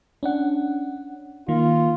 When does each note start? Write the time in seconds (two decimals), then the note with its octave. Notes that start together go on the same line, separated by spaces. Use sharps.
0.23 C#4 D4 F#5
1.48 D#3 A#3 F4